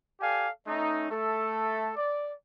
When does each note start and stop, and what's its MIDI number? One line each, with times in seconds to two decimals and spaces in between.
0.20 0.49 67
0.20 0.49 69
0.20 0.49 74
0.20 0.49 77
0.20 0.49 80
0.67 1.08 57
0.67 1.08 61
0.67 1.08 63
1.11 1.90 57
1.11 1.90 69
1.97 2.31 74